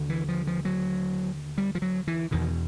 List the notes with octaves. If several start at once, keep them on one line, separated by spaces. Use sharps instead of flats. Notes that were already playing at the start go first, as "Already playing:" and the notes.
Already playing: D#2 D3
E3
F3
F3
F#3
G3
F3
F#3
E3
E2 B2 D#3